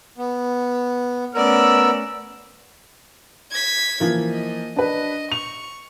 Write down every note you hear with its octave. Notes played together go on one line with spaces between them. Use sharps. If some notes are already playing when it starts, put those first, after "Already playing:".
B3
A3 B3 C#4 A#4 D5 E6
G#6 B6
E3 F3 A#3
D#5
D4 B4 D#5
C#6 F7